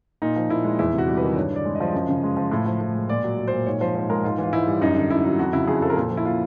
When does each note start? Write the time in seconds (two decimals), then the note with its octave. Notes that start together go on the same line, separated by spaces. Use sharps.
0.22 A#2 D#4
0.36 F3
0.50 A#2 E4
0.64 G#3
0.79 E2 E4
0.94 C3 F#4
1.08 G3
1.17 B4
1.22 D#3
1.36 G2 C#5
1.51 D3
1.56 D5
1.65 G#3
1.75 D#5
1.80 F3
1.94 F#2
2.09 C#3
2.23 G#3
2.37 F3
2.51 A2
2.66 F3
2.81 A2
2.95 G#3
3.09 A#2 D5
3.23 F#3
3.38 F#3
3.48 A#2 C5
3.66 G#2 C#5
3.81 F3 C5
3.95 G#2 C5
4.09 G#3 A#4
4.24 G#2 F4
4.38 E3
4.43 F4
4.53 G#2 E4
4.67 G3
4.81 F#2 D#4
4.96 D3
5.10 F#2 E4
5.25 F#3
5.39 F2 F#4
5.53 C#3 E4
5.67 F2 G#4
5.82 F3 A4
5.90 A#4
5.96 A#2 A4
6.11 F3
6.17 E4
6.25 A#2 F4